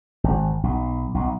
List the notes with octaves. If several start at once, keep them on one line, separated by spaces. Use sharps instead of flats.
G#1
B1
B1